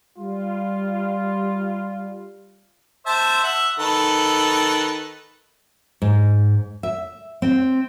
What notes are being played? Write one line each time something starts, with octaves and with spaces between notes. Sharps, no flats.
G3 F4
C5 E5 A5
E5 F#5
D#3 A4 B4
G#2
E5
C4